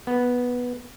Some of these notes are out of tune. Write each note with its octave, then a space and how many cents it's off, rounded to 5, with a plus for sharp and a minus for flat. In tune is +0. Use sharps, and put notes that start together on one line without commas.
B3 -5